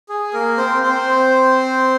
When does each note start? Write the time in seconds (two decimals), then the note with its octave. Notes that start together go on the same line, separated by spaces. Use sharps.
0.09 G#4
0.33 A#3 A#4
0.57 C4 C5
0.82 C4 C5